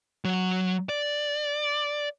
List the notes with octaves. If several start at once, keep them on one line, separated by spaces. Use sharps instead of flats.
F#3
D5